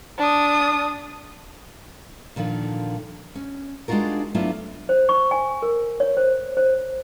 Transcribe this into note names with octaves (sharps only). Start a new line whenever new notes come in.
D4 D#6
A#2 D3 D#3 F3
C#4
G#3 D4 D#4 F4 F#4 A#4
F#3 A3 B3 D4 E4 F4
C5
C#6
G#5
A#4
C#5
C5
C5